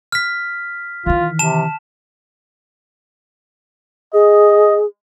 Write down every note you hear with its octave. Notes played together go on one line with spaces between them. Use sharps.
F6 B6
D#3 E3 F4
C3 A5 E7
G#4 D#5